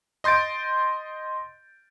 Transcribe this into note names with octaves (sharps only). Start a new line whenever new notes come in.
D#5 C6 G6 A6 D7